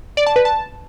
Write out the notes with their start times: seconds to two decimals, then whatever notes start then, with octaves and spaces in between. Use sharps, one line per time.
0.17 D5
0.26 A5
0.36 B4
0.45 A5